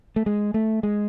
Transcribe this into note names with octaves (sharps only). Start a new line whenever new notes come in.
A3
G#3
A3
G#3